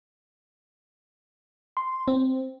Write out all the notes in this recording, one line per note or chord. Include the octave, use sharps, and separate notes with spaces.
C6
C4